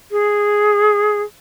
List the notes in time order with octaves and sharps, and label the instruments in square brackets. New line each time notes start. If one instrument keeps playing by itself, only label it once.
[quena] G#4